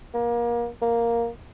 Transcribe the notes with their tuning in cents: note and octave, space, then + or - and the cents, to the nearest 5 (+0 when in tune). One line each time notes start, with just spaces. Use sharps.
A#3 +30
A#3 +0